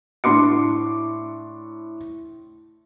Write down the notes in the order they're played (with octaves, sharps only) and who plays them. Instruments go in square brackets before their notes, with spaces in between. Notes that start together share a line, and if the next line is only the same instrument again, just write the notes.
[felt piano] A2 D4 C6 D6 C#7